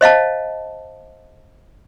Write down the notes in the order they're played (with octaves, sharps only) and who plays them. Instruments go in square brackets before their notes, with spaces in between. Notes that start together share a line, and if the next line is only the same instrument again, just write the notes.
[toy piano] C5 D#5 F5 A5